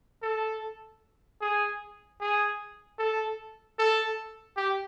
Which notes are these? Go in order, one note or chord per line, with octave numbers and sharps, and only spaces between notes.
A4
G#4
G#4
A4
A4
G4